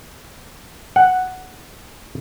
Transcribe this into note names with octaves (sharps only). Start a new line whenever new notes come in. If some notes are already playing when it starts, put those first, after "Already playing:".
F#5